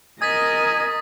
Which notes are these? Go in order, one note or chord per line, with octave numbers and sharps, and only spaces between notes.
A#4 D#5 G#5 D#6 A6 B6